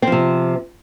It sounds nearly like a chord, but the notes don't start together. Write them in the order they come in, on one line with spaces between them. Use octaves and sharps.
C4 F3 C3